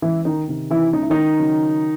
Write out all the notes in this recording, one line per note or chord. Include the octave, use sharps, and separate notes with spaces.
C#2 E3 E4
D#3 D#4
C3 D#3
E3 E4
C#2 D#4
E4
D#3 D#4
C#3 F#3